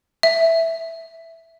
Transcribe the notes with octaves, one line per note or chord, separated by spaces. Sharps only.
E5